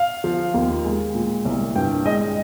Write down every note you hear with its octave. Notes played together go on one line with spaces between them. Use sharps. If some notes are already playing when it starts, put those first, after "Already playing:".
Already playing: F5
F3
D#2
G#3
A#2
C2
G2 G5
G#3 D#5